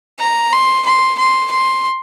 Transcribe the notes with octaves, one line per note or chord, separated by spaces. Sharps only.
A#5
C6
C6
C6
C6